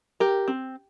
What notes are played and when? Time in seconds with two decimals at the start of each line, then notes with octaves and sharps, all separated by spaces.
0.20 G4 A#4
0.48 C4